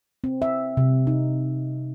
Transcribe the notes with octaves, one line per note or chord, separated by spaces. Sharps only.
C4
E5
C3
D#4